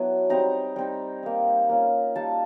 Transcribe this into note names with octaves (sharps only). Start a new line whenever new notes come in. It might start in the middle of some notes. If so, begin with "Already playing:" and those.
Already playing: F#3 B3 D4 E4
G3 C4 D#4 A#5
G3 C4 D#4
A#3 D#4
A#3 C#4 F4
G3 A#3 D#4 A5